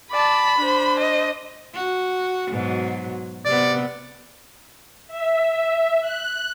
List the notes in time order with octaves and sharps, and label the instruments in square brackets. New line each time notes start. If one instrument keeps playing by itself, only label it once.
[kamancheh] D5 A5 [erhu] B5
[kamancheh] D4 C5
[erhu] D#5
[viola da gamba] F#4
G#2 B2 F#3
[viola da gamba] C3 B3 [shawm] D5
[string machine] E5
F#6